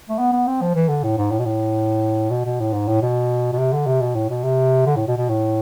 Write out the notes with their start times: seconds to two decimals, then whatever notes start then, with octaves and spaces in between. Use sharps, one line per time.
0.09 A3
0.19 B3
0.32 B3
0.47 C4
0.61 F3
0.75 E3
0.88 D3
1.03 A2
1.18 G#2
1.31 A2
1.39 B2
1.45 A2
2.30 B2
2.45 B2
2.60 A2
2.73 G#2
2.88 A2
3.02 B2
3.53 B2
3.58 C3
3.73 D3
3.86 C3
4.01 B2
4.15 A2
4.30 B2
4.43 C3
4.86 D3
4.96 A2
5.07 B2
5.18 B2
5.29 A2